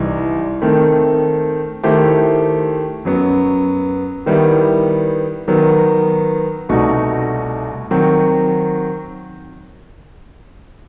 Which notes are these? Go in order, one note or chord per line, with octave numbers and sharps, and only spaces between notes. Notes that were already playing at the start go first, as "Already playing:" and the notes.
Already playing: C2 C3 E3 G3 D#4
D#3 A3 C4
D#3 A3 E4 G4 C5
F#2 F#3 B3
D#3 G3 B3 E4
D#3 F#3 B3
C2 B2 A3 D#4 F#4
D#3 F#3 C4 F#4